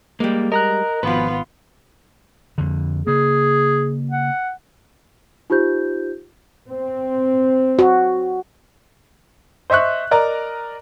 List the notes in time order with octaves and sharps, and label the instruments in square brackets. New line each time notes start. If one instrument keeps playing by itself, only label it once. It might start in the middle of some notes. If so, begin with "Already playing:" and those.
[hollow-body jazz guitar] G3 G#3 [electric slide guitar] A#3
[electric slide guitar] A#4 [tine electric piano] D#5 A#5 F#6
[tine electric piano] G#1 [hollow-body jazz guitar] B2 F3 [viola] B3 F4 [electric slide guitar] B4
[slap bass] F2 D3
[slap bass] C#3 A#3 [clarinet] G#4
[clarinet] F#5
[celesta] D#4 F4 G4 C5 G6
[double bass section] C4
[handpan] F#4
[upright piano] C5 D#5 E5 C#6 F#6
A#4 D5 D#5 A#5